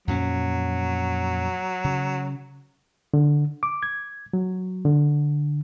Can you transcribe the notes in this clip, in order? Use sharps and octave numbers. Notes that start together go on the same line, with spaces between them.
F2 A#2 F#3 C#4
C#3
D3
D6
G#6
F#3
D3